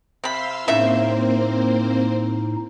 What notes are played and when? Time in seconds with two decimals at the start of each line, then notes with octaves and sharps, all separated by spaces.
0.24 C3 F5 B5 C6 E6
0.68 A2 C#3 A#3 C4 D#4 C5 E5